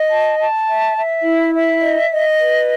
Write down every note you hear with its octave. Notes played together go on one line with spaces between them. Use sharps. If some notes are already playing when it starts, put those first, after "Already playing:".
Already playing: D#5
A5
A5
E5
E5
E4
E5
D#5
D#5
B4